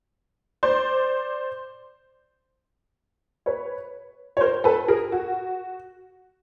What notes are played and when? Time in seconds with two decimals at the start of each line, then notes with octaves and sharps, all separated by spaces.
0.63 C5 D5
3.46 B4 C#5
4.37 C#5
4.41 A#4 C5
4.64 A4 B4
4.88 G#4 A#4
5.12 F#4